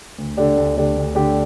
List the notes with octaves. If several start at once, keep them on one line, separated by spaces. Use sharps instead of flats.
D2
D3 A3 D4 G4
D2
D3 A3 D4 G4
D2
D3 A3 D4 G4